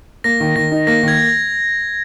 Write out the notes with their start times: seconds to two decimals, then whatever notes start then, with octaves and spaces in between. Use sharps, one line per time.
0.24 A#3 A#6
0.40 D#3
0.56 D#3 A#6
0.72 D#4
0.87 A#3 A#6
1.03 D#3 G#6